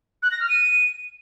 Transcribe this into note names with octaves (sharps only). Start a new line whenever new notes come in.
F#6
A#6
F6
D#7